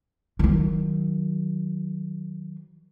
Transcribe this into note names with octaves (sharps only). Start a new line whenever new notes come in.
D#3 F#3